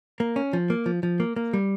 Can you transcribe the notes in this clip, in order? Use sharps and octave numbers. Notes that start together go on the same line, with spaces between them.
A#3
C#4
F3
A#3
F3
F3
A#3
A#3
G3